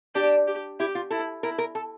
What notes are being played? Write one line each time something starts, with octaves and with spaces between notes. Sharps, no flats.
D4 G4
G4
E4 G4
F4
E4 A4
E4 A#4
A#4
A4